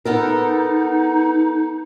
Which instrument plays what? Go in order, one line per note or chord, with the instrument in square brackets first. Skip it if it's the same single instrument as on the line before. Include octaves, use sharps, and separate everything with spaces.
[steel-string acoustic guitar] B3 A4 A#4 [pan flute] D#4